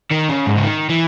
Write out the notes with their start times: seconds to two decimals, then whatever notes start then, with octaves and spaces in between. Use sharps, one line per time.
0.11 D#3
0.29 C#3
0.46 G#2
0.57 C#3
0.64 D#3
0.90 E3